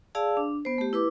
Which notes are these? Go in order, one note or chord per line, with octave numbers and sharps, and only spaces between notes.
G#4 D5 F5 A5 E6
D4
B3 C5
A3 G4
E4 B4 D6